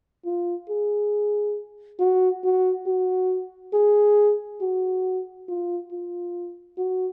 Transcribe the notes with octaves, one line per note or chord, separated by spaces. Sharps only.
F4
G#4
F#4
F#4
F#4
G#4
F#4
F4
F4
F#4